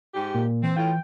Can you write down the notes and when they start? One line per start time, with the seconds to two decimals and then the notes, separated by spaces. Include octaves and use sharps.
0.14 G#2 G4
0.34 A#2
0.62 E3 C4
0.76 A2 F4 G5